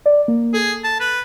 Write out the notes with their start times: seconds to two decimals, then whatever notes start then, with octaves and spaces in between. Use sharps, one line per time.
0.06 D5
0.28 A#3
0.54 G#4 A4
0.84 A5
1.00 B4